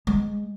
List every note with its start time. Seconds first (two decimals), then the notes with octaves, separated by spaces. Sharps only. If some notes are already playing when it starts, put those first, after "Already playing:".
0.07 G#3